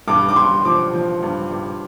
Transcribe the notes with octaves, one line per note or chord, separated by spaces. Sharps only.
G2 D6
D6
G2 C6
F3 D6
F3
G2
G2